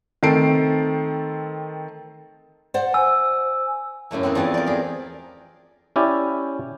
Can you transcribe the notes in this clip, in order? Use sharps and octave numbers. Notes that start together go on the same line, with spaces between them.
D#3 A3 C4 A5 C7 D7
C5 D5 F#5
G#5 E6
F#2 A2 A3 A#3
E3 B3 C4
E2 F3 C4 D5 D#5
A#4 D5
G4 G#4
C#4 E4 G4 D5